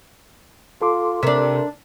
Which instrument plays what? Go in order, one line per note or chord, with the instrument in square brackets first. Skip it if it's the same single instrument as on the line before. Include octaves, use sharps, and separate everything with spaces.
[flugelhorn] F4 [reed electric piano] A4 C6 D6
[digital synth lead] C3 [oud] D4 E5 [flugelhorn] A#4